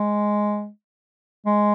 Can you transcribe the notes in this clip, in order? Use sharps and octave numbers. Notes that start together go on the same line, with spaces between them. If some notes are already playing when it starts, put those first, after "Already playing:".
Already playing: G#3
G#3